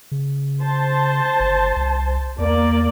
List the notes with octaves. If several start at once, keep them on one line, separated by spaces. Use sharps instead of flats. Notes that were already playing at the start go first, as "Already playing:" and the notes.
C#3
C5 A5
G1
C2
E2 A#3 D5